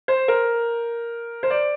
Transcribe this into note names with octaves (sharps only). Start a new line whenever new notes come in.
C5
A#4
C5
D5